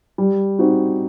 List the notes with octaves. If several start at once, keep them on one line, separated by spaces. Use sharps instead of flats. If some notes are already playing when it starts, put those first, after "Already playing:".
G3
C4 D#4 F#4